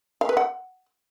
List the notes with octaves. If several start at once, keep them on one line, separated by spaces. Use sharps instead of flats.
F5
B4
F#5